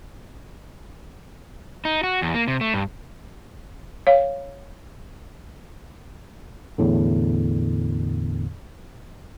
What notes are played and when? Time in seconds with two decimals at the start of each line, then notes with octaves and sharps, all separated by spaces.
1.85 D#4
2.03 F#4
2.22 E2
2.34 A#3
2.48 C3
2.61 A3
2.74 G2
4.07 C#5 F5
6.78 E2 A2 D3